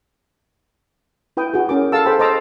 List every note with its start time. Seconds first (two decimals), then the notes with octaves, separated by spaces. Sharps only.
1.37 E4 B4 G5 D#6
1.54 F#4 G#4
1.69 C#4 G#4 A#4 D6
1.92 A4 F5 A5 E6
2.05 G#4 A4 C5 G5 B5
2.19 C5 D#5 A5 A#5 D6 E6